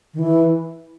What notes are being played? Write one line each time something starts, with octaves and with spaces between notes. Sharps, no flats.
D#3
E3